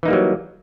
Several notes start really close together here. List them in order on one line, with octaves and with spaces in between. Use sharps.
E3 D#4 A#3 G3 F#3